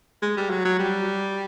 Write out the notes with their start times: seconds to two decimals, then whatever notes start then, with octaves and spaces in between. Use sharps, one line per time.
0.22 G#3
0.37 G3
0.50 F#3
0.65 F#3
0.79 G3